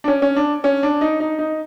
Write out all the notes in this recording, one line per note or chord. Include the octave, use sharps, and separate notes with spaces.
D4
C#4
C#4
D4
C#4
D4
D#4
D#4
D#4